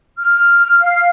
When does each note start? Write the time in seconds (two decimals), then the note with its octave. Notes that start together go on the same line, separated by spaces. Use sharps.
0.18 F6
0.80 F5